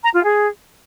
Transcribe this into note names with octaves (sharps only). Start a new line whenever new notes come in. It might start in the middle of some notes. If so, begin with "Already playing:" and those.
A#5
F4
G#4